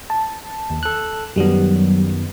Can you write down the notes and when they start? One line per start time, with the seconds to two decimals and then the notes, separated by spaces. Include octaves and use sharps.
0.10 A5
0.70 D#2
0.83 A4 F#6
1.36 F#2 D#3 F#3 G3 B3